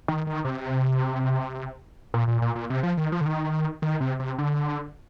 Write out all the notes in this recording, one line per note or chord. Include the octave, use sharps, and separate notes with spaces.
D#3
D#3
C3
A#2
A#2
A#2
A#2
C3
F3
D#3
F3
D3
D#3
D#3
C3
C3
D3